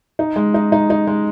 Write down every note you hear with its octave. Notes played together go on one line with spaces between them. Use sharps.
D#4
G#3
D#4
D#4
D#4
G#3